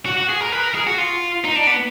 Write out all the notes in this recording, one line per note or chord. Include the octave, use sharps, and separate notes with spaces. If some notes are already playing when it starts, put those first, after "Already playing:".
F#4
F#4
G#4
A#4
B4
A#4
G#4
F#4
F4
D#4
D4
B3